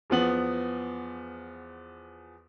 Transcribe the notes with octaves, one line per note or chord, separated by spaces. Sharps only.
E2 F3 B3 F#7